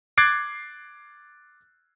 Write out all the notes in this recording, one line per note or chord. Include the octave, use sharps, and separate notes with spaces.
D6 F#6 G#6 A6 C7 D7